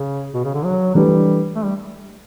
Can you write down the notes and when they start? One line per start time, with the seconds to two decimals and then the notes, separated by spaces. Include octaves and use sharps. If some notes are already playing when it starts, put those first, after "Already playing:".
Already playing: C#3
0.34 B2
0.44 C#3
0.54 D3
0.64 F#3
0.95 E3 G3 A3 D4 G4 B4
1.55 A3
1.65 G3